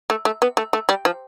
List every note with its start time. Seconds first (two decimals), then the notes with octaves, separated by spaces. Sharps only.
0.10 A3
0.25 A3
0.42 B3
0.57 A3
0.73 A3
0.89 G3
1.05 F3